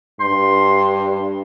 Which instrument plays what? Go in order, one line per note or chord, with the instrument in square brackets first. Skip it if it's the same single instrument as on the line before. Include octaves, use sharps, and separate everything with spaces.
[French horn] G2 [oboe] C6